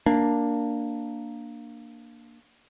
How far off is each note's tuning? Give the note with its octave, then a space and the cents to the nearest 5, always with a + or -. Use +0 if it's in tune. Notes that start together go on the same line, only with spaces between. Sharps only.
A#3 +0 D4 +0